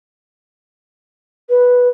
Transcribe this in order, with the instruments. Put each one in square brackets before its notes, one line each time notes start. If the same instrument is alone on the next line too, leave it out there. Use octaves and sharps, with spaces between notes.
[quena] B4